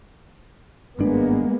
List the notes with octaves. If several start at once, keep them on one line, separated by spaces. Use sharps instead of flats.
G#1 G2 G#3 A#3 B3 D4